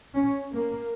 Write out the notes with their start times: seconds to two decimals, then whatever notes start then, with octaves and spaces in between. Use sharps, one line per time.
0.16 C#4
0.54 A#3